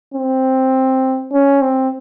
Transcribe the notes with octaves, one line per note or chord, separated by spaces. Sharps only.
C4
C#4
C4